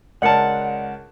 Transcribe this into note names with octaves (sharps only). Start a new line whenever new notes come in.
C#2 A#4 D5 F#5 A5 C#7